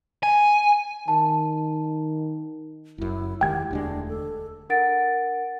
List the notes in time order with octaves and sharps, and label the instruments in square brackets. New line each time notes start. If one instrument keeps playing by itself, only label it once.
[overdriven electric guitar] G#5
[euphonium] D#3 [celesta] A5
[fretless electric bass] F#1 F#2 [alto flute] E4
[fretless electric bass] E1 D#3 G#3 [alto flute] G4 [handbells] G5 G#6
[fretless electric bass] E1 D2 G#3 [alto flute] D4
[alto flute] A4
[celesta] D4 A#4 F#5 A6 D7